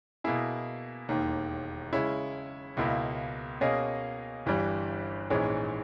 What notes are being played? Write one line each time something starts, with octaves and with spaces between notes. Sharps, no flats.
B2 A#3 E4 G#4
E1 D#2 D#3
C#3 G#3 C#4 E4
C#2 B2 A#3 E4
B2 A#3 C#4 G#4 D#5
G1 G2 E3 G3
A#1 G#2 E3 G#3 C#4